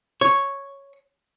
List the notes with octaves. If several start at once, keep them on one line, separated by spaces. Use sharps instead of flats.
C#5